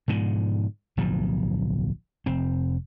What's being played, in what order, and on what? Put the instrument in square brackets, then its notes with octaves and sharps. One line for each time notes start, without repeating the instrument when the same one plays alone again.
[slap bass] G#2 B2 D3 F3
D1 B1 G2 F3
F1 C4